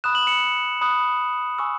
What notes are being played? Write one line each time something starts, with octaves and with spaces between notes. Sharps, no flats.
B5 D#6 F#6 E7
F#7
C#7 E7
B5 D#6 F#6
G#5 C#6 E6